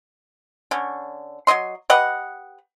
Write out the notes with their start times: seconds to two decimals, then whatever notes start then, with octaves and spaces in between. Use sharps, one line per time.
0.71 D3 C#4
1.47 F#3 D#4 D#5 C6
1.90 G4 B4 D#5 F#5